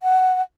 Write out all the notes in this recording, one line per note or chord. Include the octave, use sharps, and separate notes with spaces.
F#5